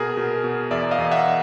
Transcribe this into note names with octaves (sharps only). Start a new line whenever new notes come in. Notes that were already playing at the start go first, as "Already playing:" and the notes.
Already playing: B2 G#4 A#4
B2
B2
E2 D5 E5
D#5 F5
E2
E5 F#5